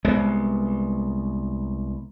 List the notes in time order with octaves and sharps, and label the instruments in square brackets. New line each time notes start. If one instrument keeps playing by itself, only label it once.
[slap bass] C2 G#3 B3